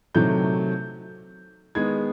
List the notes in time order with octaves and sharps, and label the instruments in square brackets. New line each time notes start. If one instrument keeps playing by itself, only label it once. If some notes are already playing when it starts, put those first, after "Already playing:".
[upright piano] C3 D#3 F#3 A3 G6
D#3 G#3 B3 G#6